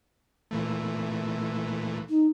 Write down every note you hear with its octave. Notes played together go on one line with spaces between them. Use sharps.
A#2 E3 A3
D#4